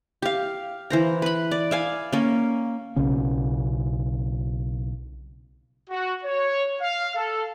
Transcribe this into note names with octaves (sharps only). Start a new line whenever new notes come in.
G4 F5
E3 C5 A#5
B4 B5
D5
E5 F5 G#5
A#3 C#4
B1 C#3 C#4
F#4
C#5
F5
A4